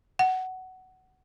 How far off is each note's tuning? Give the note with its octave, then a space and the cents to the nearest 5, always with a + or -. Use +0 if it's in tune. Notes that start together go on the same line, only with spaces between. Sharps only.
F#5 +15